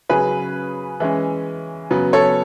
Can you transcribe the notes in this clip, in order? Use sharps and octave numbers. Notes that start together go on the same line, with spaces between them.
C#3 F#3 C#4 G#4 B4
E3 G#3 C#4
C#3 F#3 B3
A4 C#5